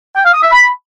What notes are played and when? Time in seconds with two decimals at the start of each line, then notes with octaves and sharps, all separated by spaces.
0.16 G5
0.25 F5
0.34 D#6
0.43 E5
0.52 B5